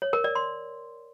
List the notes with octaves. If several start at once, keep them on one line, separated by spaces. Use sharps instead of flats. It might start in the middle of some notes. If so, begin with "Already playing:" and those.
C#5
A#4
D5
C6